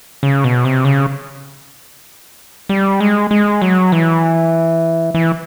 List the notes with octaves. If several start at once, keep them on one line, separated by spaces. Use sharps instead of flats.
C#3
B2
C3
C#3
G3
G#3
G#3
F#3
E3
E3